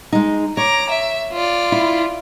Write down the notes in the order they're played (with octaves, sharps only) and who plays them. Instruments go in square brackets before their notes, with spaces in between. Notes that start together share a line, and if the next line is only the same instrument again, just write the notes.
[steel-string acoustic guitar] G#3 D#4
[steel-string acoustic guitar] C#5 [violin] A#5 D6
[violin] E5
F4 D5
[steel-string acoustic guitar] E4